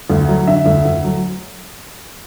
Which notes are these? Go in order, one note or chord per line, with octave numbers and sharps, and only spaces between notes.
D2
F#3
D3 E5
D2
D2
F#3